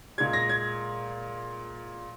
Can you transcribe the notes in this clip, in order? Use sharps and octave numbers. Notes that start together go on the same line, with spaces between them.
A#2 G#3 G#6
A#6
G#6